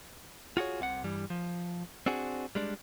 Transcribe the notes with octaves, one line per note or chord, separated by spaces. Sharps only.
F4 F#4 G#4 C#5
C2 C3 F5 F#5
G2 E3 G3
F3
C4 D4 F#4 G#4
G3 G#3 D4